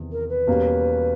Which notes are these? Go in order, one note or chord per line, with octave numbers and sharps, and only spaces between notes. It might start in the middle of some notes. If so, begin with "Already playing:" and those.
Already playing: E2 C3 D#3 B3
A#4
B4
E2 B2 G3 A#3 C#4